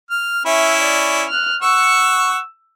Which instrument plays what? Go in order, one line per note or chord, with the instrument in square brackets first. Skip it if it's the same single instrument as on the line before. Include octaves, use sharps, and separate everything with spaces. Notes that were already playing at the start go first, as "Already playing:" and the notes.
[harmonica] F6
[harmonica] C#4 E4 [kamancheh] E5
[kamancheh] D5
F6 F#6
[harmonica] F#5 C#6 [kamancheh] E6